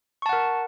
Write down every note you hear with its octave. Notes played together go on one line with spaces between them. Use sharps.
A#4 F#5 A5 C#6